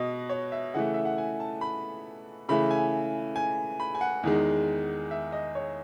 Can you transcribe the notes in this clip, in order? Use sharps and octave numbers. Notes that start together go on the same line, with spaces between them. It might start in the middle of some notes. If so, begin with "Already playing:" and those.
Already playing: B2 F#4 D#5
C#5
E5
C#3 E3 A3 F#5
E5
F#5
G#5
A5
B5
C#3 E3 A3 B5
G#5
G#5
B5
G#5
F#5
E2 D#3 G#3
E5
D#5
C#5